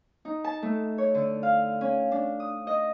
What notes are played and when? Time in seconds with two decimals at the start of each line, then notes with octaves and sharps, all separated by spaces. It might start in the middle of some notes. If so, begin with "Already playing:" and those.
0.25 D#4
0.44 A5
0.62 A3
0.98 C#5
1.14 D3
1.43 F5
1.81 C#4
2.12 D4
2.40 D#6
2.67 D#5